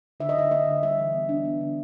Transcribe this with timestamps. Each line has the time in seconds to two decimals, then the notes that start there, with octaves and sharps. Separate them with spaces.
0.20 D3 E5
0.29 D#5
0.35 D3 E5
0.51 A#3 D#5
0.66 D3
0.83 G3 E5
0.98 E3
1.14 B3
1.29 D4
1.45 B3
1.61 D3